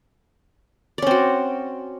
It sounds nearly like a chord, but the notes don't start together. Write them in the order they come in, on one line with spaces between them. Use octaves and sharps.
D5 C#4 C4 F#4